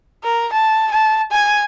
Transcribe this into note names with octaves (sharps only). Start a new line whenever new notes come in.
A#4
A5
A5
G#5